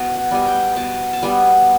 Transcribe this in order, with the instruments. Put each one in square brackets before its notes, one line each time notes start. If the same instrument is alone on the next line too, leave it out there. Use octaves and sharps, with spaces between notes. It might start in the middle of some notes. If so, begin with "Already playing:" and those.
Already playing: [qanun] B2
F#5
G3 B3 G#5
G5
B2 A5
A5
G3 B3 G#5